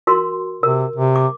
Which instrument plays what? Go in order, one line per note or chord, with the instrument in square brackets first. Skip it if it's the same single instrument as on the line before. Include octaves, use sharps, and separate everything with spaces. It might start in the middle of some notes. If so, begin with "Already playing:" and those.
[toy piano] F#4 A#4 C6
[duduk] C3 [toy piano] A#4
[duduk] C3
[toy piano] D6